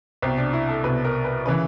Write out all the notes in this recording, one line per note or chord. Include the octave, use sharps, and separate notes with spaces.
C2 B2 C4
D4
E4
A4
C2 B2 B4
A#4
B4
C#3 E3 B4